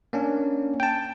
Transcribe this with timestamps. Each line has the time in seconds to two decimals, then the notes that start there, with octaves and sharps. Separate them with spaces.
0.13 A#3 C#4 D4
0.80 G5 A5